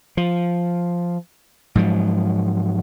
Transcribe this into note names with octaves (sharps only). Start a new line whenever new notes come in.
F3
G#2 F3 F#3